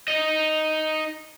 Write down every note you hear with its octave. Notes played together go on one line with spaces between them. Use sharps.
D#4 D#5